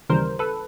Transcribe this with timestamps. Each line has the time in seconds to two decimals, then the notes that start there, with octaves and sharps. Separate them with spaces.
0.10 D#2 C#3 E3 G3 A#4 C5
0.39 A4 B4